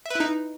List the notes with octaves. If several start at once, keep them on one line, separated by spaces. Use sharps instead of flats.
D#4 E4 B4 E5